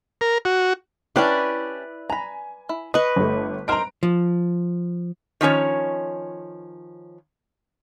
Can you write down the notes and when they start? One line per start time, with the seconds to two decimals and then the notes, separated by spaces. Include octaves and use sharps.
0.21 A#4
0.45 F#4
1.16 C#4 D4 E4 G4 B4 D5
2.10 G#5 A#5 B5
2.69 E4
2.94 B4 D#5 C#6
3.16 G1 A3
3.68 D#4 A#4 C5 A#5 D7
4.03 F3
5.41 D#3 F3 C#4 C#5